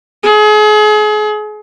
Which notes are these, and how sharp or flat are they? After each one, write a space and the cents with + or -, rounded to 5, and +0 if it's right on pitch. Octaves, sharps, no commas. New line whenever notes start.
G#4 +35